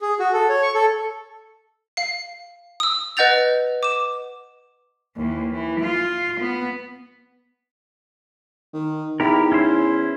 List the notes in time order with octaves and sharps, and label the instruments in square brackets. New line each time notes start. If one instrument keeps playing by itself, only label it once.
[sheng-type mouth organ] G#4
F#4
A4
C#5
C#6
A4
[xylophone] F5 C7
D#6 E6
B4 D#5 F#5 G6 A6 F7
D6 E7
[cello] D#2 E3
E3
F4
B3
[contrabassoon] D#3
[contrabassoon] E2 [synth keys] D#4 [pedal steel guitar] E4 G4 A#4
[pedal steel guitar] C#4 E4 C5